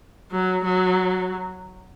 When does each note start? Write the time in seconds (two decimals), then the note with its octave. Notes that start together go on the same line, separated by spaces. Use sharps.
0.32 F#3
0.64 F#3